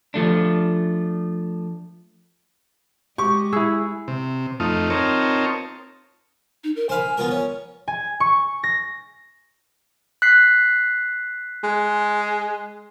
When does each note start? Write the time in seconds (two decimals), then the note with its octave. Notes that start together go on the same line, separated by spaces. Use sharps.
0.14 F3 A3 D4
3.18 G#3 G4 C#6
3.53 E4 G#4 F#5 E6
4.08 C3
4.60 F2 A3 D#4 F4
4.90 C4 D#4 F4 A#4 C#5 A5
6.64 D#4
6.76 A#4
6.89 C5 F5 G#5 B5
7.18 B3 F4 A#4
7.31 C#4
7.88 G#5
8.20 C#6
8.63 A#6
10.22 F#6 B6 C7
11.63 G#3